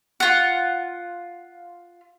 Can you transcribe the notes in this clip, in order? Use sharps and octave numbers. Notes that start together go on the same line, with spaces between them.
F4 F#5